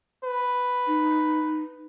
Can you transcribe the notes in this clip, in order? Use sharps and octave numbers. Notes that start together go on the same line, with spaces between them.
B4
D#4